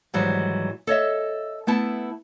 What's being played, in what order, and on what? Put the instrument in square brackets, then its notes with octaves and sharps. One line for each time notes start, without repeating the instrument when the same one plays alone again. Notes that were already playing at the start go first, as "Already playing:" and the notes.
[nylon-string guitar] G#2 D#3 E3 F#3 G3
A4 C#5 D#5 E5
A3 B3 E4 A5